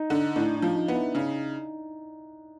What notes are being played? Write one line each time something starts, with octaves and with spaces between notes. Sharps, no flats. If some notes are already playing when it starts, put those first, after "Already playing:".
Already playing: D#4
D3
A2 D4
D#4
F3
D#4
B3
E4
C#3 D#4